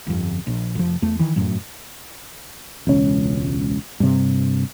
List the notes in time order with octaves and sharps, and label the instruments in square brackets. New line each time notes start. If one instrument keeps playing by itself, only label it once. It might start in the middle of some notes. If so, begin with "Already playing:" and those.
[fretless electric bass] G1 F2
A#1
F1 F3
E2 A3
D#3 E3
F1 F#2 A2 F#3
E1 C#2 C#4
G2 C3